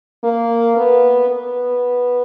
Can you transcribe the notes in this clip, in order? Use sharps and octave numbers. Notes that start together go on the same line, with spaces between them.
A#3
B3
B3